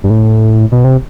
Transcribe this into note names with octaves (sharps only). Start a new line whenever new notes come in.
G2
A2
B2
C3